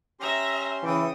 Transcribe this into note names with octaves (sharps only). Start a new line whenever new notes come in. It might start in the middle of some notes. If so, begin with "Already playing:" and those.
C#4 G4 E5 A#5 C6 A#6
C#3 E3 G5 D#6